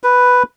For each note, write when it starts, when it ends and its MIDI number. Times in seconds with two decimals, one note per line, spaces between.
0.03 0.43 71